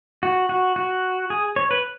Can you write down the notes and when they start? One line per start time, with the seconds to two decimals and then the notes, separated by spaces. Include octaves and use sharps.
0.23 F#4
0.49 F#4
0.76 F#4
1.30 G#4
1.56 C#5
1.71 B4